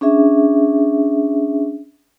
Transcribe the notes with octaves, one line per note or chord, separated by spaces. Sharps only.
C#4 D4 G#4 E5